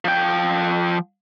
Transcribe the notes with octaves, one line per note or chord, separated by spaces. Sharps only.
F3 G5